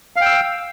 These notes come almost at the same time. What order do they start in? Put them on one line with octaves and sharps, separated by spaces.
F5 G5 E6